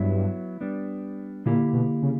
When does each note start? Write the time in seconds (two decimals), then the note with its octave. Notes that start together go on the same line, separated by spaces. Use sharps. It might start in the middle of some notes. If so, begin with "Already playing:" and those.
Already playing: G2 F#3 B3 E4
0.61 G3 B3 D4
1.46 A#2 D3 A#3 E4 G4
1.73 B2
2.02 C#3